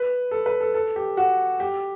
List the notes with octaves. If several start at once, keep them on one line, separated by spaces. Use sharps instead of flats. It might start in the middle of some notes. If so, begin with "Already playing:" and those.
Already playing: B4
A4
B4
A4
A4
G4
F#4
G4